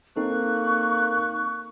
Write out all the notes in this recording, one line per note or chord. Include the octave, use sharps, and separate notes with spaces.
A#3 C4 D#4 A4 C#6 F#6